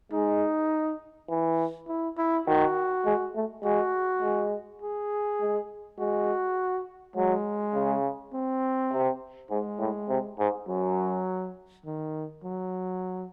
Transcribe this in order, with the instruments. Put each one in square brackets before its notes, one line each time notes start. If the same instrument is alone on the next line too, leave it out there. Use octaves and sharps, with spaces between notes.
[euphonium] G#3 [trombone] D#4
[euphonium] E3
[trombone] E4
E4
[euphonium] D#3 [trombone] F#4
[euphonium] G#3
A3
[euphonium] G#3 [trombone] F#4
[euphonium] G#3
[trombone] G#4
[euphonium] G#3
[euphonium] G#3 [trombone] F#4
[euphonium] F#3 [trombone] G#3
[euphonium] C#3
[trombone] C4
[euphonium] C3
[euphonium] G#2 [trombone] G#3
[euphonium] A2
C3
G#2
[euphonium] F#2 [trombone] F#3
[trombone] D#3
F#3